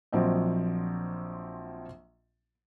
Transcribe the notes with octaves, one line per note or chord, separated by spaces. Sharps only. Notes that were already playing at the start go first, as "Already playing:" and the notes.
A#1 F3 F#3 C4 D#5